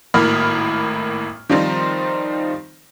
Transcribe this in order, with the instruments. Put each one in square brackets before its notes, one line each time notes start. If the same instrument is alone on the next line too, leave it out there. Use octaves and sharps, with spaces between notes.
[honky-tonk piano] G#1 A2 A#3 B5 D#6 F6
D#3 F3 G3 C4 D#4 C5